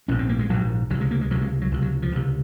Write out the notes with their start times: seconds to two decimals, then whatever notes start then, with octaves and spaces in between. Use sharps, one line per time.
0.08 A#1 G#2 C#4
0.19 C4
0.29 A#3
0.39 G#3
0.49 A#1 G#2 F#3
0.90 C#2 F#3
0.94 C3
1.01 G#3
1.11 A#3
1.21 G#3
1.31 C3 F#3
1.35 C#2
1.42 G#3
1.61 F#3
1.72 C#2 C3
1.82 F#3
2.02 F3
2.12 C#2 C3